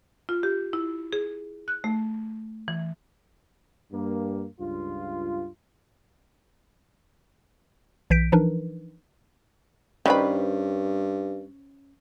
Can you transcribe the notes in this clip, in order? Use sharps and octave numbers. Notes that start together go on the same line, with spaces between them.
F4
G4
E4
G#4
F#6
A3
E3
G2 A#3
C#2 G2 F4
B1 E3 G6 B6 D7
E3 F3 D4 D#4 A#4 B4
G2 D#3 C#4 B4 C5 D5 B5